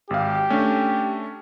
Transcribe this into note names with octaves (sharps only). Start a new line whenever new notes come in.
G#1 G4 F5
A3 C#4 D4